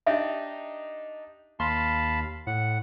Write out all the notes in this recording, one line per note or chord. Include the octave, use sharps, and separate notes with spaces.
D4 D#4 G4 E5
D#2 F5 A5 B5 C6
A2 F#5